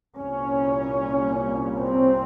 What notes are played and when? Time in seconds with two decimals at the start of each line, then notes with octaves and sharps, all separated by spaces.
0.18 C2 A#2 C#4
1.84 C4